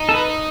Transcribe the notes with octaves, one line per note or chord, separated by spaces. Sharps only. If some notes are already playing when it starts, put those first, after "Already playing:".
Already playing: D#4
A4
B4